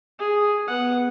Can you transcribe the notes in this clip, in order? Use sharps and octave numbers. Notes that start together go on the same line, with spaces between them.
G#4
B3 F#5